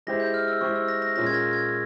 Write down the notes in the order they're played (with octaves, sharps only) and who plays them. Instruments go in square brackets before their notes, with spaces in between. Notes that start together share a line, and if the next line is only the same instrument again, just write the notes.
[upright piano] G#3 E4 G4 C5 [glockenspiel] A#6
[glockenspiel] G6
F6
E6
[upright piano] G#3 E4 G4 C5 [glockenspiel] C#6
[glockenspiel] E6
A#6
A#6
[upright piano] A#2 G#3 C#4 F4 [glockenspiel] A#6
[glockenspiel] G#6
A#6
G#6